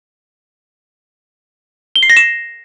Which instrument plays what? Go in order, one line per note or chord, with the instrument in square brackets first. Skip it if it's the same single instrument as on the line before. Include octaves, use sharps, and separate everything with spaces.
[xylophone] G7
C7
A#6
E7